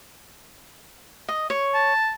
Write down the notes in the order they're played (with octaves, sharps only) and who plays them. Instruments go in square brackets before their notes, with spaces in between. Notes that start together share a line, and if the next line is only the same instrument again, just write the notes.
[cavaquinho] D#5
C#5
[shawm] A5